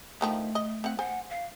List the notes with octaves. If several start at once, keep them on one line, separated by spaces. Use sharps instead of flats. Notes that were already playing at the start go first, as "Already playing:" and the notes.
D3 D#3 F3 A3
D#5
C4 F#5
C5 F#5 G#5
F5